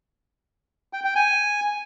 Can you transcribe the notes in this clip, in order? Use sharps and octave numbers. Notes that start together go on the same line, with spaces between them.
G5
G5
G#5